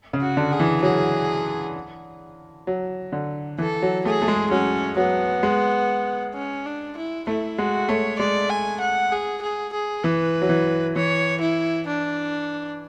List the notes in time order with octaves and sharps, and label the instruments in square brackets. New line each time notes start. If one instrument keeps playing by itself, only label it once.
[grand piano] C#3
[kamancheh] F#4
[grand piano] D3
[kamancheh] G#4
[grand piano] E3
[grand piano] F#3 [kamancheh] G#4
[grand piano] F#3
D3
[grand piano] E3 [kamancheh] A4
[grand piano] F#3
[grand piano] A3 [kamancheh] G#4
[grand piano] A3
G#3
[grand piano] F#3 [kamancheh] C#4
[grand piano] F#3 [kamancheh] B3
[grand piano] G#3
[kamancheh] C#4
D4
E4
[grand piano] A3 [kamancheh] E4
[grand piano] G#3 [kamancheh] F#4
[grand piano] A3 [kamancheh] C#5
[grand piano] G#3 [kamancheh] D5
[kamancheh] G#5
F#5
G#4
G#4
G#4
[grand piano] E3 [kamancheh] B4
[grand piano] F#3
E3
[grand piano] E3 [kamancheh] C#5
[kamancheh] E4
D4